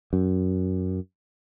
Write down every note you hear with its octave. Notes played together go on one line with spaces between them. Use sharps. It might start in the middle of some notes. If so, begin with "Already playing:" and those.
F#2